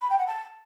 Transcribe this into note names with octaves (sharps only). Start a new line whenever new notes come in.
B5
G5
F#5
A5